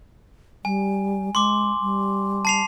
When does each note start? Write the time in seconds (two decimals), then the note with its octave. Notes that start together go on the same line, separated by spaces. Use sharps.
0.65 G3 G#5
1.35 G#3 C6 D6
1.81 G3
2.45 A5 C7 F7